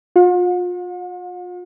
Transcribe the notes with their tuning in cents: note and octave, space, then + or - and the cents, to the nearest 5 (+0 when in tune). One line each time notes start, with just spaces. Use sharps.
F4 +35 F#5 -45